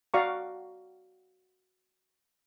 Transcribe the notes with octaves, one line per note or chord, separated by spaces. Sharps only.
F#4 D5 F5 A#5 C#6